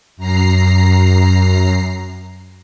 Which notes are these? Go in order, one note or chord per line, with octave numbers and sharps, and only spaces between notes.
F#2 A#5 C7